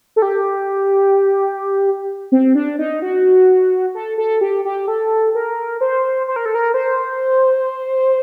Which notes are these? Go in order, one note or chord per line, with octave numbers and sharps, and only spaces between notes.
A4
G4
C4
D4
D#4
F#4
A4
A4
G4
G4
A4
A#4
C5
C5
A#4
A4
A#4
C5